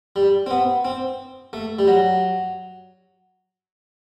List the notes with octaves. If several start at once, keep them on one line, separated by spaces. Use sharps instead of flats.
G3
C4
B3
C4
A3
G3
F#3